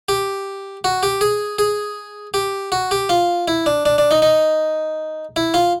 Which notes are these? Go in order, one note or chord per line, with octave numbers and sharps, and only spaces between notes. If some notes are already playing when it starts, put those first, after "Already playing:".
G4
F#4
G4
G#4
G#4
G4
F#4
G4
F4
E4
D4
D4
D4
D#4
D#4
E4
F4